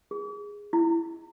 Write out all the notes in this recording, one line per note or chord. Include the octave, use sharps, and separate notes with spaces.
G#4
E4